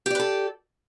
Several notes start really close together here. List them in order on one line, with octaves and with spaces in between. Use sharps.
G4 D5 B4 A4